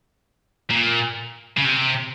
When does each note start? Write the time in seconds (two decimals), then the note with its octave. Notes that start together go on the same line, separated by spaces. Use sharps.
0.71 A#2
1.57 C#3
1.64 C3